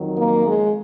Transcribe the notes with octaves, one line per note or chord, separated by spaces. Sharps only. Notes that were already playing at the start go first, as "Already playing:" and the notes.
Already playing: F2 D#3 F#3
A#3
G#3